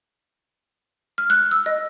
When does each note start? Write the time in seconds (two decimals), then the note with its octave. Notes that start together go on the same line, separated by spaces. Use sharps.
1.18 F6
1.30 F#6
1.51 E6
1.66 D#5